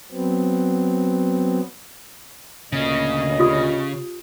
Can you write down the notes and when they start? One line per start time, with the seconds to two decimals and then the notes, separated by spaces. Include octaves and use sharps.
0.12 F#3 B3 C4
2.73 D2 A#2 C#3 D#5
3.39 F4 G4 D#6